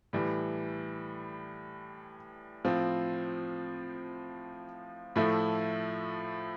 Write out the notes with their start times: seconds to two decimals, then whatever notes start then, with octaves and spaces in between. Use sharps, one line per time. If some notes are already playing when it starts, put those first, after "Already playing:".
0.13 A2 E3 G3
2.65 A2 F3 C4 F4
5.16 A2 F3 A3 E4